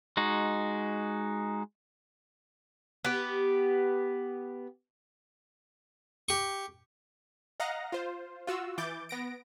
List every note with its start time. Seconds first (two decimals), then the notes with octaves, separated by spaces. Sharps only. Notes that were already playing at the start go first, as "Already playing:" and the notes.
0.17 G#3 D#4 F#4
3.05 B3 G4
6.29 G4 C#6
7.60 D#5 F5 F#5 A#5 A#6
7.92 F4 C5
8.47 F4 F#4 E6
8.78 E3 D6 G6 A6
9.09 B3 A#6 D7